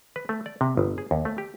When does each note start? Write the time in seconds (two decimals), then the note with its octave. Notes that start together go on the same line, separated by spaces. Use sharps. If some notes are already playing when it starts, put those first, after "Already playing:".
0.16 B4
0.29 A3
0.46 D5
0.61 C3
0.77 G1
0.98 G#4
1.11 D#2
1.25 A3
1.38 G4